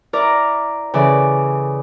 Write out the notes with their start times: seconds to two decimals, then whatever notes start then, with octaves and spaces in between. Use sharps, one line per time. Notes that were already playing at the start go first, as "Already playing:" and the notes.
0.13 E4 A#4 D5 A#5 D6
0.94 C#3 E3 A4 D5